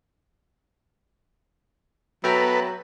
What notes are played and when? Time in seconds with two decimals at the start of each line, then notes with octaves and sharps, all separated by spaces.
2.24 F#3 B3 A4 B4 E5 G5 A#5